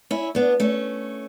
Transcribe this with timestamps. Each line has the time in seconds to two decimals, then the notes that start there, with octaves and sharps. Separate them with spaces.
0.11 C#4 E4
0.35 B3 D4
0.60 A3 C#4